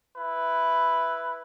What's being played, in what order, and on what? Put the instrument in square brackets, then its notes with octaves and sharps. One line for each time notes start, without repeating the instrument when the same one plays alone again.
[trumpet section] E4 B4